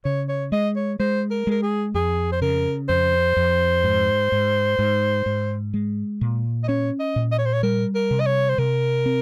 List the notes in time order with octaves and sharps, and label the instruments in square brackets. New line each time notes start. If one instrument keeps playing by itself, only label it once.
[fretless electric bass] C#3 [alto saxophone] C#5
[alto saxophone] C#5
[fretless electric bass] G#3 [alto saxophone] D#5
[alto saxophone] C#5
[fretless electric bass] G#3 [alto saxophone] C5
[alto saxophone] A#4
[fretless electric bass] G#3 [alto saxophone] A#4
[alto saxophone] G#4
[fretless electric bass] F2 [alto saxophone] G#4
[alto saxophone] C5
[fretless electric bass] C#3 [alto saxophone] A#4
[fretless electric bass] F2 [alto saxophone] C5
[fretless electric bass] F2
G#2
G#2
G#2
G#2
G#3
A#2
[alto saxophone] D#5
[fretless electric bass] C#4 [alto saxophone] C#5
[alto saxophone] D#5
[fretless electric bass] A#2
[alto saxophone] D#5
C#5
C5
C#5
[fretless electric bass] G3 [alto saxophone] A#4
[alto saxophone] A#4
[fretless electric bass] C3
[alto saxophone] D#5
C#5
C5
[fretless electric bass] C3 [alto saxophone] A#4
[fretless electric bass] C4